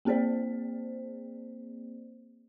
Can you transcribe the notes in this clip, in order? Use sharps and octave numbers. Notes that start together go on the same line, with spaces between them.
A#3 C4 G#4 C5 D5